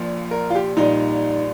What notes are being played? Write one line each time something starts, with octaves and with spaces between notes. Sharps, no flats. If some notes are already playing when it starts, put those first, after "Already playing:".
Already playing: A#1 A#2 F3
A#4
F4
G4
A#1 A#2 G3 D#4